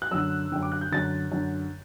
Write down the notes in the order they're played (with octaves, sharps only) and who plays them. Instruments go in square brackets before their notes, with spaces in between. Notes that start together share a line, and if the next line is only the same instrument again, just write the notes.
[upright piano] F#6
F#2 D3 E6
F#2 D3 G5
D6
F#6
G6
F#2 D3 A6
F#2 D3